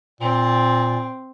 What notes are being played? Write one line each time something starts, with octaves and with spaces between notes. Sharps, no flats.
A#2 C4